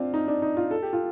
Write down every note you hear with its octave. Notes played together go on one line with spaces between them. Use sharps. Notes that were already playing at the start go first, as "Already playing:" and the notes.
Already playing: C4 D4 F4
D#4
D4
D#4
F4
A4
G4
F4